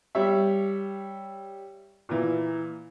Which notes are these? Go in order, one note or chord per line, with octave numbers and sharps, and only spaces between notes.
G3 C#5 E5
A#2 E3